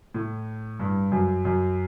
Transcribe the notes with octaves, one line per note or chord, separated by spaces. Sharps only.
A2
G2
F#2
F#2